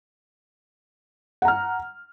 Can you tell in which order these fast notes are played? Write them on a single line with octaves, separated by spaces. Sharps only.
F#5 A#5 F6